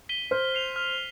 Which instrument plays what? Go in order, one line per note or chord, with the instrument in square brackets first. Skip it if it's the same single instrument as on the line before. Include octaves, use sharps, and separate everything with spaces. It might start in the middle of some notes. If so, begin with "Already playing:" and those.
[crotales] B6 D#7 G7
[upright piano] C5 [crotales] F6
[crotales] C7 F7
F6